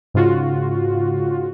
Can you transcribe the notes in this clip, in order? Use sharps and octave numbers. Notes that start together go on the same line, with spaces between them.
G#2 C#3 F4 F#4